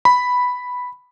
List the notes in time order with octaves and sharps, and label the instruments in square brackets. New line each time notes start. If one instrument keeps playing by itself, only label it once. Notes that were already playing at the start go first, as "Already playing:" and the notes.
[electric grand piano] B5